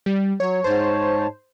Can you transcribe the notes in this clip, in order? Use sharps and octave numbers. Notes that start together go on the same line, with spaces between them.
G3
F#3 C#5
G#2 C5 C#5 A5